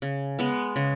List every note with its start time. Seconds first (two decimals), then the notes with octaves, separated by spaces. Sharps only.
0.02 C#3
0.39 G#3 B3
0.76 C#3